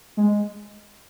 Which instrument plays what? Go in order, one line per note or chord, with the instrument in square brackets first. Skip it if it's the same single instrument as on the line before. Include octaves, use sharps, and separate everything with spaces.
[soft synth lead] G#3